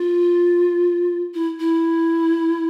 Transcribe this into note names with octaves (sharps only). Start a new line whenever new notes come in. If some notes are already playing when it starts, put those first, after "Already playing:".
Already playing: F4
E4
E4